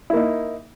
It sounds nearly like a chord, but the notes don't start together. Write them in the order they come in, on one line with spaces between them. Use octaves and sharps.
E4 A#3 D#4